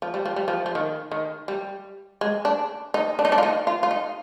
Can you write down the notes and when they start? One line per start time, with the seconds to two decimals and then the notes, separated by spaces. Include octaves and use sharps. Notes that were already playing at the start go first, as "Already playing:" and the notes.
0.02 F3
0.14 G3
0.26 F3
0.36 G3
0.48 F3
0.66 F3
0.75 D#3
1.11 D#3
1.48 G3
2.21 G#3
2.45 D4
2.94 D#4
3.19 D4
3.25 D#4
3.32 D4
3.38 F4
3.43 D#4
3.67 F4
3.83 F4
3.91 D#4